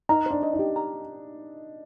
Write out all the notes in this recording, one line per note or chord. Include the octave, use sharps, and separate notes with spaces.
D#4 A#5
D4 C5
D#5
D#4
G4
A#5